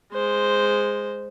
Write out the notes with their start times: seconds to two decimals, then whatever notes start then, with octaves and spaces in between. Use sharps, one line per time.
0.13 G#3 C5